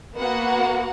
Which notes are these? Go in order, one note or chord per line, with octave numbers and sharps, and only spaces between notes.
A#3 B3 F#4 F#5